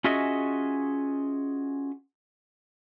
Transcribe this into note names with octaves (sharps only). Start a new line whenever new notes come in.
C#4 F4 F#4 G#4 D#5 E5